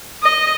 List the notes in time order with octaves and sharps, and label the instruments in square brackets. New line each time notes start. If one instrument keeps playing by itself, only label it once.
[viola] D#5